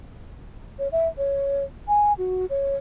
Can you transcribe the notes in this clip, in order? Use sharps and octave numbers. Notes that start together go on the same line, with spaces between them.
C#5
E5
C#5
G#5
F#4
C#5